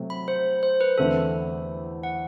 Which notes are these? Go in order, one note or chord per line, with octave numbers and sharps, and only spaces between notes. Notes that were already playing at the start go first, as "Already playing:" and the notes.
Already playing: C3 F#3 A3
B5
C5
C5
B4
E2 D3 A3 C4 E4 A4
F#5